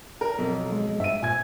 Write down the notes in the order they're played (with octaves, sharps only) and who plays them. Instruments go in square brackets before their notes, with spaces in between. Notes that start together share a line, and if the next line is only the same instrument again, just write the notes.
[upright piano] A#4
B1 F2
[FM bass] G#3
[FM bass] G2 [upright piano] E5 D#7
[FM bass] A#2 [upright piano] G#5 G#6